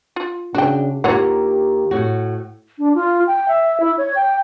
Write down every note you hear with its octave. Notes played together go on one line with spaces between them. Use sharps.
F4
C#3 D4 F#4 G5
D#2 G#2 A#3 F4 G4 C#5 F#5
A2 F#4
D4
F4
G5
E5
E4
C#5
G5